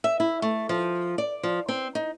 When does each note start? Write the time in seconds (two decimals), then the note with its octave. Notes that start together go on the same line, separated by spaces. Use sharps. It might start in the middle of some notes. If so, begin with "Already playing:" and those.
0.04 E5
0.20 E4
0.42 A3
0.69 F3
1.18 D5
1.43 F3
1.68 C4
1.95 D#4